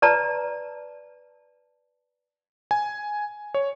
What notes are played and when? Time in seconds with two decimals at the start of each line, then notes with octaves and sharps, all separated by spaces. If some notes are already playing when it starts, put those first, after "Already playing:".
0.02 B4 D5 A5 A#5
2.71 G#5
3.54 C#5